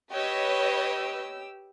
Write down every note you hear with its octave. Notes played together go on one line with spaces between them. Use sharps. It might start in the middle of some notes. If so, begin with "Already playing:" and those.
G4 B4 C#5 D#5 E6